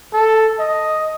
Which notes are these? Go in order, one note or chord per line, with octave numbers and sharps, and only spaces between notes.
A4
D#5